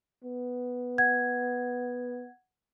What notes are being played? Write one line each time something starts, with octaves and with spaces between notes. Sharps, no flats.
B3
F#5 G#6